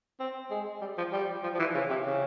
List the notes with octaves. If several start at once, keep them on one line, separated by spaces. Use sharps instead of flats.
C4
G#3
G3
F3
G3
F3
F3
E3
C#3
C3
C#3